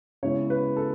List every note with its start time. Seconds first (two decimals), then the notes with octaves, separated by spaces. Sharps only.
0.23 C#3 G#3 B3 E4 C#5
0.50 B4
0.76 A4